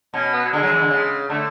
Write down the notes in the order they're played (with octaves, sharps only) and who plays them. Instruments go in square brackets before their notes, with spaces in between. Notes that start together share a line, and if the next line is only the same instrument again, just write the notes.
[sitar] B2 [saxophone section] C#4
[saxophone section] B3
F#3
[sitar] D3 [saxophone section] G#3
[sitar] F#3
E3
D3
C#3
[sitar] D3 [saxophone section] A3